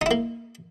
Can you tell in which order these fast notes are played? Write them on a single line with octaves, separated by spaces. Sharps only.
D#4 E4 A#3